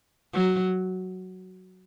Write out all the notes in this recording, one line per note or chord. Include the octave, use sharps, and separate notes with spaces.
F#3